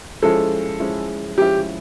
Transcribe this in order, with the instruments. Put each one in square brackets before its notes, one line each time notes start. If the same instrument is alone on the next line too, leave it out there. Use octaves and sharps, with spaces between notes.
[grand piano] F3 G#3 C#4 E4 [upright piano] A4
[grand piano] F3 G#3 C#4 E4
[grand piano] F3 G#3 C#4 E4 [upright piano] G4